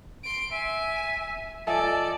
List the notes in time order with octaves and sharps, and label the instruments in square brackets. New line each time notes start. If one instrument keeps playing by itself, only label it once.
[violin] C6 D7
[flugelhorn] E5 [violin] G#5
[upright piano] F3 D#5 G#5 [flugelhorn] A4 [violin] D5